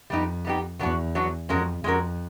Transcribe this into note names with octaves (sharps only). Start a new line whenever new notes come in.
F2 G3 B3 D#4 G4
G3 B3 D#4 G4
E2 F#3 B3 D4 F#4
F#3 B3 D4 F#4
F2 G#3 C#4 F#4 A#4
F2 G#3 C#4 F#4 A#4